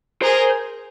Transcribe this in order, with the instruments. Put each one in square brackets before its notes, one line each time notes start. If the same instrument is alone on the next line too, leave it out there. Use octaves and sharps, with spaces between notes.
[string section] G#4 A#4 [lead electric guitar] C5